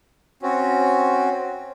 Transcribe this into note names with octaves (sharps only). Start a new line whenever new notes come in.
C4 C#4 F#4